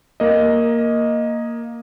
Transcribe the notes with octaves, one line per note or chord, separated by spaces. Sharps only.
A#3 D#5